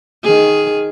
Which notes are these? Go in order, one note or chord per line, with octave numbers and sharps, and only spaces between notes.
D#3 G#4